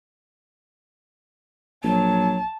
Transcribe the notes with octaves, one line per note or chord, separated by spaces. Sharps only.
A#1 F#3 A5